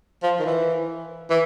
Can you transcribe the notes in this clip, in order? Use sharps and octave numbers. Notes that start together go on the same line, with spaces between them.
F3
D#3
E3
E3